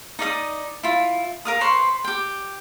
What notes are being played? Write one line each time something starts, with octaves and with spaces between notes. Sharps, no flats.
D#4 D5 E5 D#6
E4 F4
A#4 F5 D#6
B4 C5 C6 C#6
G4 G5